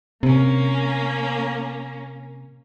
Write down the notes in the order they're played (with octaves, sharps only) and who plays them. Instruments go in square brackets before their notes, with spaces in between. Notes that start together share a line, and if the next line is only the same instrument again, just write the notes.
[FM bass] C3 [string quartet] A#3 C#4